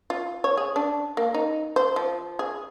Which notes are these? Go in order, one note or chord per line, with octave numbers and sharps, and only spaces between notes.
F4
C#5
G#4
D4
A#3
D#4
C5
F3
G#4